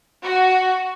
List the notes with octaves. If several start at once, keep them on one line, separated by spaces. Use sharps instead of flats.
F#4